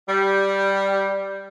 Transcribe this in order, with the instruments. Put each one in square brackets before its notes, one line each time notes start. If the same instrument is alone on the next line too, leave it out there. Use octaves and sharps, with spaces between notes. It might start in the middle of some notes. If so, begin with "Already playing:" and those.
[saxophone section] G3